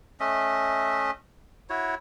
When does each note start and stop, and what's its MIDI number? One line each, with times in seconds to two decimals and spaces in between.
0.20 1.11 57
0.20 1.11 61
0.20 1.11 75
0.20 1.11 76
1.70 1.95 64
1.70 1.95 66
1.70 1.95 73